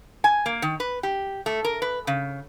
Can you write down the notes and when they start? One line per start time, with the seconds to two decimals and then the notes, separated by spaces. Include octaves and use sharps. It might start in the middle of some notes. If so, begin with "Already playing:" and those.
0.24 G#5
0.46 A#3
0.62 D#3
0.80 B4
1.03 G4
1.46 A3
1.64 A#4
1.82 B4
2.07 C#3